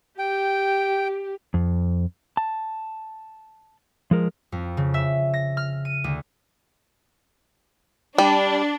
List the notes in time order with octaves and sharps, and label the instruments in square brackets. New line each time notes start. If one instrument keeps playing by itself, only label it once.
[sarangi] G4 [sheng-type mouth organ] G5
[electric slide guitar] F2
A5
F3 G#3 A#4
[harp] F2
C#3
E5
A#6
F6
D#7
D2
[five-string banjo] G3 [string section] D4